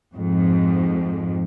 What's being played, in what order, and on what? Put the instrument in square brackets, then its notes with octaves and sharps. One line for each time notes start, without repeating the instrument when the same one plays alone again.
[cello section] F2 G#2